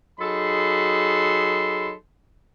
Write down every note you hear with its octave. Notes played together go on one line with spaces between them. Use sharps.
F#3 D#4 G#4 A4 B5 C6